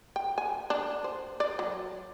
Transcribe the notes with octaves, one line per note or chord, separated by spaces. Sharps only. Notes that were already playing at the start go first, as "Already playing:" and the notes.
G5
G#5
D4
C5
D5
F#3